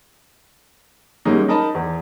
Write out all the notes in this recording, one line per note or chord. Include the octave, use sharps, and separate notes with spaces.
F#2 G3 G#3 A#3 C#4 D#4
D#4 A#4 D#5 A5 B5
E2